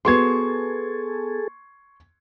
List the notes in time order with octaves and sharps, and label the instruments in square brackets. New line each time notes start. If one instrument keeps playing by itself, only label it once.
[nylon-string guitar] B3 F#4 C5 [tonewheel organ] G#4 A4 [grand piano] C6 C#6 G#6